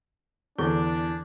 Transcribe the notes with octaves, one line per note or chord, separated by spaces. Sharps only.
E2 D3 E3 D4 A4